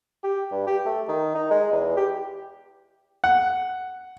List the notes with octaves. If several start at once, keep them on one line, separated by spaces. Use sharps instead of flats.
G4
G2
G4
A3
D#3
D#4
G#3
E2
G4
F#5